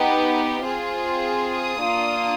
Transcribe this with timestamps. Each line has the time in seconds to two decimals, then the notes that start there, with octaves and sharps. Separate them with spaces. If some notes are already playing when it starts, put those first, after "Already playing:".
Already playing: B3 D#4 G4
0.65 C4 F4 G#4
1.54 D#6
1.83 A#3 D4 F4